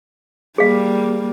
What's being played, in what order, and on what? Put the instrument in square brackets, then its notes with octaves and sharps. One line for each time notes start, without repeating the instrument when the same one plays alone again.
[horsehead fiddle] G3 A#3 [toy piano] G#4 F5